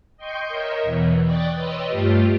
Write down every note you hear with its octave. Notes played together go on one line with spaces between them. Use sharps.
D#5 G5 C6 C#6 G6
A#4 C#5 D#5 E5
E2 B2 E3
D5 G5 C#6 D#6 F#6 A6
B4 C#5 D#5 G5 C6 E6
G2 A3 F4 G4